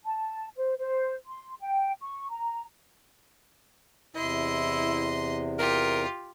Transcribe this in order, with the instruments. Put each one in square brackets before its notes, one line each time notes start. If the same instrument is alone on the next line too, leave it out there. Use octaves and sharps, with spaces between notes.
[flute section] A5
C5
C5
C6
G5
C#6
A#5
[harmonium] E2 C3 [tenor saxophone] E4 [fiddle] D#5 C6
[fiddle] F4 G4 [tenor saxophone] A#4